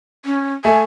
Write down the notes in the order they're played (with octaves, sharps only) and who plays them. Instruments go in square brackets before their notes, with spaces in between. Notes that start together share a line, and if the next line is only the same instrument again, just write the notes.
[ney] C#4
[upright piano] A3 [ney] G#5